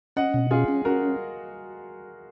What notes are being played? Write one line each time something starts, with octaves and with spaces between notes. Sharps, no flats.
C#4 D#5 F#5
B2
C#4 F4 G#4
C#4
C#4 F#4 A#4